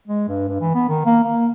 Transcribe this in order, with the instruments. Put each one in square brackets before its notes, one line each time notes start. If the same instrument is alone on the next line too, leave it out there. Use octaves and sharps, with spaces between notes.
[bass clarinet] G#3
G2
G2
E3
B3
D#3
A#3
A#3